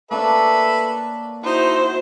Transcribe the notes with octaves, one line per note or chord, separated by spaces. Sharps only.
A#3 D4 A4 B4 C#5 E5
D#4 E4 F#4 C5